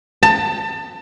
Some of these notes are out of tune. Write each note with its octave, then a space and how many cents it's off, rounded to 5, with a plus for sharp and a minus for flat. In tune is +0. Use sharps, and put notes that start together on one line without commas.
A5 +25